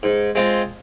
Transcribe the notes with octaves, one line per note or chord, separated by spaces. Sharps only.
G#2
G#3 C4 F4